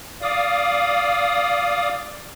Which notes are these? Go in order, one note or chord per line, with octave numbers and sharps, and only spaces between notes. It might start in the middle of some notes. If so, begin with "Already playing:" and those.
D5 F5 D#6